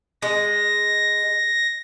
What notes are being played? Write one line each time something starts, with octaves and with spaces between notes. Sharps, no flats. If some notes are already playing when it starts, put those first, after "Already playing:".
G#3 A#6